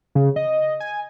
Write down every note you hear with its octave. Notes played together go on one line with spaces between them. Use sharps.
C#3
D#5
G#5